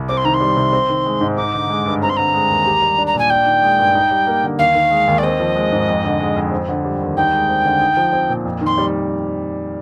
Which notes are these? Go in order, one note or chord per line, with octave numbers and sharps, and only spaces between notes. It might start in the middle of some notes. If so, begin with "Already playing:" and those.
Already playing: C2
C4 D6
C6
D#3 A#5
C6
G3
C3
C4
D#3
G#3
G#2
D#4 D6
D3
G#3
G2
C4 A#5
C6
D3 A#5
G#3
D#2
G4
G3
D4
A#5
A#2 G#5
D4 G5
D#3
G#3
G2
D#4
G3
A#3
D3
D#2 F5
D#3
G#3
D#2
D5
C4 D#5
F3
G#3
G#2
F2
D3
G#3
F2
C4
D3
G3
D#2
D#4 G5
G#3
C4
D3
D#4
F3
C4
A#2
F2
D#3
C6
G3